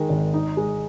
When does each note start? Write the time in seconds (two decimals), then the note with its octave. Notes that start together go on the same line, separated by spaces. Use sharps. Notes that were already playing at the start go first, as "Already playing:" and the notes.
Already playing: D#3 G#3
0.09 G#1
0.34 D#4
0.57 G#3